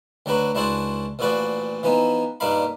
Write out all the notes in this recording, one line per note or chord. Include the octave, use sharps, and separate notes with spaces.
D2 F#3 D4 F#4 B4
C#2 D4 E4 F#4 C5 A5
A1 A#2 F3 F#4 B4 D5
E3 F3 B3 D#4
G2 A#2 D4 D#4 F5 B5